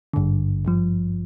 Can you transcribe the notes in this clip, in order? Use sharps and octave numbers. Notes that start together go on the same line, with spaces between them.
G#1 G2 D3
G#1 G2 F3